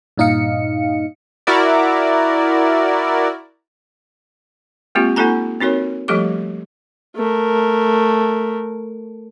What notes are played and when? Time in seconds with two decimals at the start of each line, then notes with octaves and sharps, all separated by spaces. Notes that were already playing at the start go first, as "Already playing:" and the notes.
0.17 G2 A#2 D#4 D#5 F5 C#7
1.47 E4 F#4 A#4 D5
4.95 G#3 A#3 C4 F4 G4
5.16 A#3 D#4 F4 A4 G#5 A#5
5.60 C4 D#4 F#4 A#4 C#5
6.08 F3 G3 A3 G4 A4 D6
7.16 A3 A#4